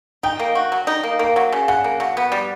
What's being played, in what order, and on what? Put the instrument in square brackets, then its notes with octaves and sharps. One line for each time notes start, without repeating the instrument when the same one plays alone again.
[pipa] D#4 [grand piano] G5
[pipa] A#3
F#4
F#3
D#4
A#3
A#3
F#3
C#3
[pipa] C#3 [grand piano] F#5
[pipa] A#3
F#3
B3
G3